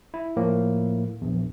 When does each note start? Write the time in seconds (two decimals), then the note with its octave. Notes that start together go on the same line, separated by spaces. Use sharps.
0.14 E4
0.36 A2 F3 A#3
1.21 A#1 E2